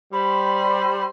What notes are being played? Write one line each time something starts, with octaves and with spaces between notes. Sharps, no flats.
G3 C5 B5